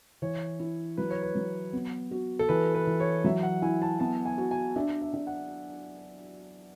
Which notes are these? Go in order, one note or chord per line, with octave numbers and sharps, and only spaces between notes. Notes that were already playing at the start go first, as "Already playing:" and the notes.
E3 C#5
E4
F#3 B4
C#5
B4
F#3
B3
F#4
A4
E3 B4
B4
E3
C#5
F#3 E5
F#5
E4 G#5
A5
B3 A5
G#5
F#4
G#5
D4 E5
E5
D4
F#5